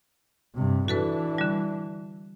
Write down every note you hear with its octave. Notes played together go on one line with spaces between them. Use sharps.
G2 C3
E3 D4 F#4 A4 B4
D3 G3